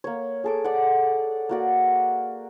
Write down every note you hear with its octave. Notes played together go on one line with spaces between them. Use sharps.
A#3 C#5
G#4 A4 D6
D5 F#5
A#3 F#4 D5